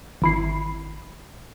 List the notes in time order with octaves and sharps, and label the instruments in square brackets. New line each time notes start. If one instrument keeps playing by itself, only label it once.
[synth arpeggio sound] G#1 E4 C7